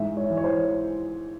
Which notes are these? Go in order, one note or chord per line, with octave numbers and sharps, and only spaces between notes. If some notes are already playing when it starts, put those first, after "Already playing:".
Already playing: G#2 E3 E5
C#5
E3
C#5
C5